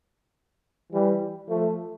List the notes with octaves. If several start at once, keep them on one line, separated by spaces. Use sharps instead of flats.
E3 G3
F3 A3